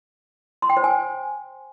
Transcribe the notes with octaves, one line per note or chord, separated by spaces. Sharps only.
C6
G5
C5
G#5